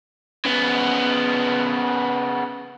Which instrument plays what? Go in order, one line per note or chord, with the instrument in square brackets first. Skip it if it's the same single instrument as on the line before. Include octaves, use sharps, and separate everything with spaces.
[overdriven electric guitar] C#3 B3